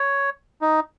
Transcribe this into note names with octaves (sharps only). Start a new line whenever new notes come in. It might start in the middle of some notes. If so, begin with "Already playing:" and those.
Already playing: C#5
D#4